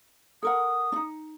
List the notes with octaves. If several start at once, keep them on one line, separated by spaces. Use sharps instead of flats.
A4 A#4 F#5 D#6
D4 D#4